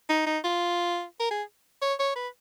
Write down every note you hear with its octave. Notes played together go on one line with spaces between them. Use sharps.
D#4
D#4
F4
A#4
G#4
C#5
C#5
B4